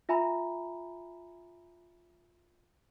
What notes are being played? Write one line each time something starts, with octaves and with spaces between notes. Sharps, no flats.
F4 E5 G#5 A#5 B5